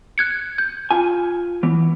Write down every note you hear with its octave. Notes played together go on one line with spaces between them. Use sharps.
F#6 G#6 C#7
G6
F4 G#5
E3 B3